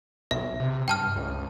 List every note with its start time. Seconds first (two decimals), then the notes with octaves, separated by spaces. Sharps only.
0.31 B1 E5
0.60 C3
0.88 G2 G5 A5 F6
1.16 C#2